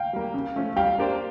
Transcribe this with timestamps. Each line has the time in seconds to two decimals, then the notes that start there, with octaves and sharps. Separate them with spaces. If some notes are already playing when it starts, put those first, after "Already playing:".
Already playing: F5 G5
0.13 G3 A#3
0.34 C#3
0.56 F3 A3 C#4
0.76 G3 F5 G5
0.98 A#3 D4 G4 C5